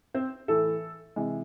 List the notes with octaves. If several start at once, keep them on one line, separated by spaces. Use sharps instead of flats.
C4 C5
A2 E3 A3 A4
C3 E3 G#3